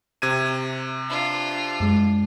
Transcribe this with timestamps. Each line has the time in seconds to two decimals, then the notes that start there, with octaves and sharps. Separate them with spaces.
0.22 C3 G#6 D#7
1.08 D4 F4
1.80 F#2 G#3